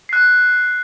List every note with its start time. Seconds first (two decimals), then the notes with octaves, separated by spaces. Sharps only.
0.09 F#6 C7